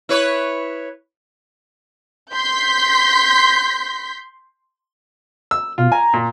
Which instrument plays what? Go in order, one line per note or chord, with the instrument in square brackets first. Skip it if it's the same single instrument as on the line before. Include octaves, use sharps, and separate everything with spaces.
[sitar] E4 B4 C#5
[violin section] C6 G6 B6
[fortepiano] E6
[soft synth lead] B2 [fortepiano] F4
[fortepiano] G#5 [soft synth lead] A#5
[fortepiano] A#2